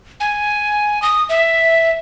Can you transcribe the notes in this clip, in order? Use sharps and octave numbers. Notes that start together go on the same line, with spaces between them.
G#5
D#6
E5